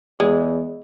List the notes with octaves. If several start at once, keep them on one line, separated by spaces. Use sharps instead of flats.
E2 G#3